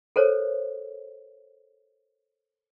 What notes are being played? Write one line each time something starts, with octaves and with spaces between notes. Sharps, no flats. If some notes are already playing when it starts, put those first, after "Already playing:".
A4 A#4 C5 C#5